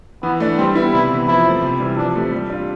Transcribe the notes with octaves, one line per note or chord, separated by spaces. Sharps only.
E3 B3
A3 D4
G3 C4
B3 E4
C3 E4
E3 B3
F3 E4
A3 C4
C3
E3 G3
F3 D4
A3 C4 G4
G3
D4 F4